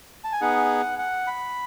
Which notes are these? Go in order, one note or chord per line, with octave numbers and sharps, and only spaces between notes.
A5
G#5
B3 D#4 G#4 F#5
F#5
B5